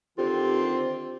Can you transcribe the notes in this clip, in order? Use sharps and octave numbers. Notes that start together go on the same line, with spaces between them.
D3 D#3 C4 F4 G4